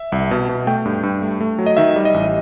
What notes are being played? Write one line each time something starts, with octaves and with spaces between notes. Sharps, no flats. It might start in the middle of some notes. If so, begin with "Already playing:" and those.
Already playing: E5
C2
B2
B2
A3 G5
G2
G2
A3
A3
F#3
D#5
D#3 E5
G3
D#5
A1